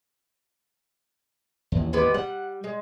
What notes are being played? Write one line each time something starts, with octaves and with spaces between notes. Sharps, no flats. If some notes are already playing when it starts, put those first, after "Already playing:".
A1 D#2
G#3 B3 G4
G3 F#5
G#3